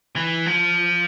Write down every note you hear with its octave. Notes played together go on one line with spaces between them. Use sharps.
E3
F3